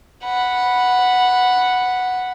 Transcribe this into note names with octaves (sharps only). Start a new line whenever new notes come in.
F#5 B5